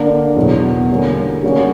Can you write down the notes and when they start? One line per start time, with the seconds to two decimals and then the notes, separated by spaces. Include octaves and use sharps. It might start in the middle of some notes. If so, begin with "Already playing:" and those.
Already playing: D3 A#3 D4
0.36 E2 B2 F#3 B3
0.90 D3 G3 A#3 C#4
1.43 C#3 G3 A#3 C#4 F#4